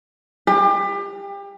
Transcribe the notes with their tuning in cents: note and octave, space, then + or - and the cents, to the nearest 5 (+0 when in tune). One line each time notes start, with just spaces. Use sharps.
G4 +30